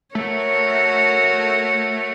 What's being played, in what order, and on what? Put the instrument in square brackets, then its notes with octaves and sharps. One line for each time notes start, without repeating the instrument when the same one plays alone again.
[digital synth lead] A3 [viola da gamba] F#4 A#4 C#5